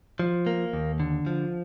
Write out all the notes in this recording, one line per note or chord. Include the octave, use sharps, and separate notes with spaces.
F3
A#3
D#2
D3
F3